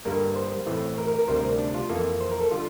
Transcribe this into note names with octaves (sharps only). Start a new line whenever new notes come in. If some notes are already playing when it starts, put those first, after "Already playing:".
G2 D3 G3 A#3 A#4
C5
A2 E3 A3 C4
A#4
A#4
A#4
D2 C3 G3 C4 C5
A#4
D4
F4
F2 E3 A#3 A4
C5
A#4
A4
D3 G3 F4